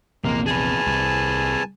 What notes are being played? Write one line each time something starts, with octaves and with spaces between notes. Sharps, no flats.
A#1 E2 C3 G#3 A#3 A#4
G#4 B4 G#5 A5
C2